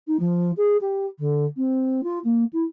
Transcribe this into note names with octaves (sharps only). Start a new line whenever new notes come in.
D#4
F3
G#4
G4
D3
C4
F4
A#3
E4